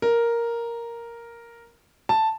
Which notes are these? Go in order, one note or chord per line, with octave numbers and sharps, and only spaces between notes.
A#4
A5